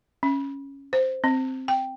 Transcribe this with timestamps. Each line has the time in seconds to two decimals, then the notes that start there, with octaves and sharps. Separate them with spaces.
0.23 C#4
0.93 C5
1.24 C4
1.68 G5